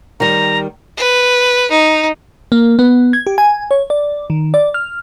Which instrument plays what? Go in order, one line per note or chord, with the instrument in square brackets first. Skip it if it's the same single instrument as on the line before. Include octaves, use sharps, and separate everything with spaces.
[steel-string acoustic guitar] D#3 G3 [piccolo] A#5
[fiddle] B4
D#4
[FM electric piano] A#3
B3
G#6
G4
G#5
C#5
D5
D#3
D5
F6